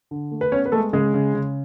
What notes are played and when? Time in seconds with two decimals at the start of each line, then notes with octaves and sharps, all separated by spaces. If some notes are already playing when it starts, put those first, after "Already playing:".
0.11 D3
0.31 A3
0.41 B4
0.52 B3 C#4 C#5
0.66 B4
0.72 G#3 A3 A4
0.93 C#3 G#3 G#4
1.14 C#3
1.34 C#3